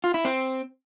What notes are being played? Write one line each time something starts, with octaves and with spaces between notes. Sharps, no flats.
F4
E4
C4